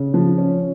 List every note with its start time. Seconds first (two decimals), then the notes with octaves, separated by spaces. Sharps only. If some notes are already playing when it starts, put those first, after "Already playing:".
Already playing: C#3
0.14 F3
0.38 C#4